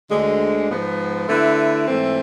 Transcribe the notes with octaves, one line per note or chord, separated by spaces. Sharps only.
D2 D3 G#3
G#2 F3 B3
D3 A3 E4 B4
G#2 E3 A3 C4